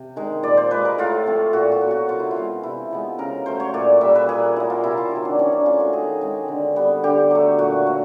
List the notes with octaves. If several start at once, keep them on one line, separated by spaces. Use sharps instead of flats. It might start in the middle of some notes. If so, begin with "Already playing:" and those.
Already playing: C3
D#3 G#3
A#2 D5
C5
F3 G#3 B4
A#4
A2 F4
F3 A3 C4
A#2 F#4
F#4
F#3 B3
F#4
C3 F4
E4
F4
E3 G#3 B3
C3 E4
F3 G#3 B3
C#3 A#4
F#3 A3 C5
C#5
A#2 D5
G3 A#3 E5
B4
A#2 G#4
F#3 A#3 E4
F4
C3 E4
F4
D#3 F#3
D4
E3 C#4
D4
A3 C#4 F4
F#4
D#3 G#4
G#3 C4
D3
G3 B3
D3 G4
F#3 A3
A#2 F#4
F#3 A3